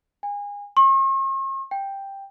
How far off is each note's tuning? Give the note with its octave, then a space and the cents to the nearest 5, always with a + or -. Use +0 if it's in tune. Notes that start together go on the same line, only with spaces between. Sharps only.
G#5 -30
C#6 -45
G5 +5